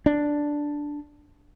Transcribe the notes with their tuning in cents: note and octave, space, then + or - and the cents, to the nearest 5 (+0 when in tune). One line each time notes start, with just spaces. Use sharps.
D4 +0